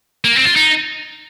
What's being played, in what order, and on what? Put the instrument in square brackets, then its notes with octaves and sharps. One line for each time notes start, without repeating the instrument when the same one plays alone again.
[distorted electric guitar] A#3
C4
F4
D#4